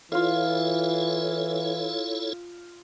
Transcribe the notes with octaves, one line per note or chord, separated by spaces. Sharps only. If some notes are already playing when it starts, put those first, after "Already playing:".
E3 E4 F4 A4 C#5 F5